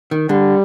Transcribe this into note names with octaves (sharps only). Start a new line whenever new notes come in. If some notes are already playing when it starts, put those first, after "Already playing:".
D#3
D3 G3